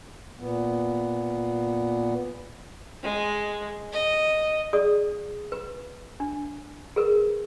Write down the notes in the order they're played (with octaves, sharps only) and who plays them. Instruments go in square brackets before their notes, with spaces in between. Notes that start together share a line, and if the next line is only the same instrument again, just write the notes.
[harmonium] A#2 B3
[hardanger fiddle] G#3
D#5
[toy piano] G#4 D5 D#6
B4
D4
G#4 A#4 B4